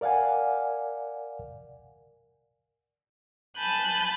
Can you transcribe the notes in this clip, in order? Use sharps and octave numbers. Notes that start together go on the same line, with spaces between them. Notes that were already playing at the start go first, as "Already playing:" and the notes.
A#4 D5 F5 F#5 G#5
G#5 A5 B5 F#6 G6